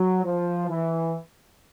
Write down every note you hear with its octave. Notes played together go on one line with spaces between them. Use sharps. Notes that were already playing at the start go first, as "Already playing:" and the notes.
Already playing: F#3
F3
E3